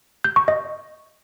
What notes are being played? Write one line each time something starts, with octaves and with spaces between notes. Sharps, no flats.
G6
C#6
D#5